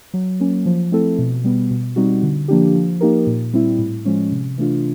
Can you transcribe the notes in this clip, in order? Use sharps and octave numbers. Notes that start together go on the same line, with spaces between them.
F#3
A#3 C#4
F3
A3 C4 E4 A4
B2
G3 B3
B2
G3 C4 D#4 F#4
D3
F3 A#3 D4 G4
F3
A#3 D#4 G4 A#4
A#2
G3 C4 E4
A2
F3 G#3 C#4
C3
E3 A3 D4 F4